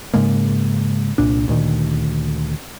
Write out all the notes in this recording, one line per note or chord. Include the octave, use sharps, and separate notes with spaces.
G#2 C#3 G#3 A#3
C2 A#2 D4
D2 A#2 D#3